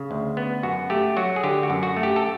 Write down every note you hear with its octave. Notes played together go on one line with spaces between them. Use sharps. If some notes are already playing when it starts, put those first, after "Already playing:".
Already playing: C#3
D2
B3
F#2 F#4
A3 G4
F#3 F#4
G#4
D3 G4
F#4
F#2
F#4
A3
G4
A4